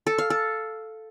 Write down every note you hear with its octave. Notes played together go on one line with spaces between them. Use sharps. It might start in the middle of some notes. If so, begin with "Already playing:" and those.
A4
F5
A4